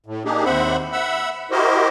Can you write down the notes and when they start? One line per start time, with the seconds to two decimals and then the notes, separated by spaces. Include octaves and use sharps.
0.06 A2
0.25 A#3 D4 D#4 G4 G#4
0.45 D#2 C4 C5 E5 F#5 B5
0.92 E5 F#5 B5 E6
1.51 E4 F#4 G4 A#4 C5 D#5